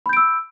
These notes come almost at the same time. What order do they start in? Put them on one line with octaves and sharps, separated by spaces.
B5 G6 D7 E6